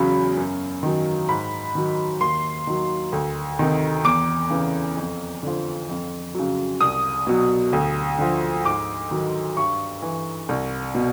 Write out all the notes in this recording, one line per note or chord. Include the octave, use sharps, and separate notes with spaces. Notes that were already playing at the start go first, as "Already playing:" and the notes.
Already playing: E2 C#3 F#3 B5
F#2
D#3 F#3
G#2 B5
D#3 F#3
D#2 C6
D#3 F#3
D2
C3 D#3
E2 D6
C#3 E3
F2
D3 F3
F2
C#3 F#3
C2 D#6
B2 F#3
D2
D3 F3
G#2 D6
D#3 F#3
G2 C#6
E3
C2
B2